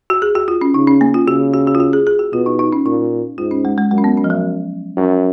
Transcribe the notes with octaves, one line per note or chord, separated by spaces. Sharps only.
F#4
G#4
F#4
F4
C#4
C#3 D#4
C#4
A#3
F4
C#3 F#4
F#4
F#4
F4
F#4
G#4
G#4
F#4
B2 F4
D#4
D#4
C#4
A#2 D#4
G#2 F4
C#4
G#3
G#3
F#2 G#3
C#4
B3
C#4
F3
F#3
F#2